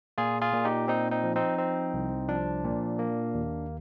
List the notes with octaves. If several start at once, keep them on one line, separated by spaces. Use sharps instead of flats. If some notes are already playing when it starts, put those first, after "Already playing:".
A#2 F4 G#4
F4 G#4
A#2
D#4 G4
C4 D#4
C4 D#4
F3
C4 D#4
C4
C2
F3 D4
A#2
A#3
D#2